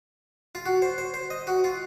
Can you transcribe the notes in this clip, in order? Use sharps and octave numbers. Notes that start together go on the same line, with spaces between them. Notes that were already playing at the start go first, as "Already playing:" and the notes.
F4
F#4
C5
C5
C5
D#5
F#4
F4